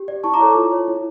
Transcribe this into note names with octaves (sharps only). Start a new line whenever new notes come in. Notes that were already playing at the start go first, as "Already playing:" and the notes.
Already playing: G4
D5
E4 A5 C#6
A#5 D6
A4 C#5
F4
C#5
E4